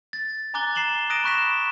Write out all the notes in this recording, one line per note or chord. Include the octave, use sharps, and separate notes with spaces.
A6
G#5 A#5 D6 F#6 A6 G7
A#5 C7 E7 F#7 G7
D#6 F#6 A#6 D7 D#7
B5 C#6 F#6 B6 E7